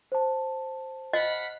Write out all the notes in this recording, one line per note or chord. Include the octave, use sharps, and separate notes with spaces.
C5 A5
D#5 F5 F#5 B5